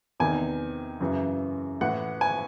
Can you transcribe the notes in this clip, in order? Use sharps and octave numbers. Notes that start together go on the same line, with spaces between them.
E2 C3 D#3 G#5
F#2 C#3 E3
A2 E3 F#5
G#5